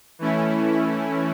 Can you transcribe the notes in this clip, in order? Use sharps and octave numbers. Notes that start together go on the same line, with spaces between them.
E3 A3 C#4 E4